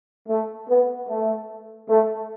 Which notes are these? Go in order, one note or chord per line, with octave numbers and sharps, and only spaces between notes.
A3
B3
A3
A3